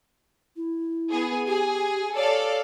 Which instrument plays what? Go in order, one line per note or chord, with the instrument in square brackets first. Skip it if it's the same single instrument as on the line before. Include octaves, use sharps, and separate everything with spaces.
[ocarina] E4
[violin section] B3 G#4
[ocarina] G4 [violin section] G#4 G#5
[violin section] A4 D5 F5 [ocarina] C#5